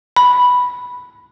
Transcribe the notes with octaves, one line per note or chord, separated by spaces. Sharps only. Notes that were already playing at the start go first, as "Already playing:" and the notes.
B5